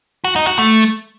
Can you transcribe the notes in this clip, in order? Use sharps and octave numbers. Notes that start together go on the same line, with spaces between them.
F#4
D#4
F#4
A3